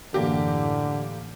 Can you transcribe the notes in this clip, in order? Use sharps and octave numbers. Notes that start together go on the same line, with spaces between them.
F#2 A2 D3 E3 A#3 G4